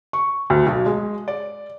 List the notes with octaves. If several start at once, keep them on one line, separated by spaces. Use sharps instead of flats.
C#6
D2
B1
G#3
D5